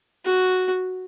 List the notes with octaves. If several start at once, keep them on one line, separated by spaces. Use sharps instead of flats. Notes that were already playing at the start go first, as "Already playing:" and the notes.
F#4